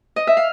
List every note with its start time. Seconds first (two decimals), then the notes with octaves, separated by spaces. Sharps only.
0.16 D#5
0.27 E5
0.37 F5